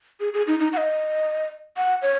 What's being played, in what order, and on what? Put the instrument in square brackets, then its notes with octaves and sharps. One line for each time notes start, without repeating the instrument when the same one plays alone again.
[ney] G#4
G#4
D#4
D#4
F#5
D#5
F#5
C#5